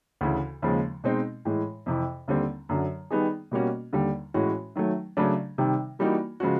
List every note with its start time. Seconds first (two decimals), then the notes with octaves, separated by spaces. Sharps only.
0.21 D2 C#3 E3
0.62 D#2 C#3 F3 G#3
1.04 B2 G#3 C4 D#4
1.45 A2 E3 G#3
1.86 F2 C3 E3
2.28 D#2 D3 G3 C4
2.69 F#2 D3 F#3
3.11 D#3 G3 B3 D#4 G#4
3.51 B2 G3 A#3 C#4 F#4
3.93 D#2 D3 G3
4.34 A2 E3 G#3 C#4 F#4
4.76 D#3 F#3 A3
5.17 C#3 F#3 A3 D4
5.58 C3 D#3 G3
5.99 E3 G3 A#3 D#4 F#4
6.40 C#3 F3 G#3 C#4 F#4